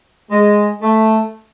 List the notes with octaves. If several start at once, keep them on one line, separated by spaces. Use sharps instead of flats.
G#3
A3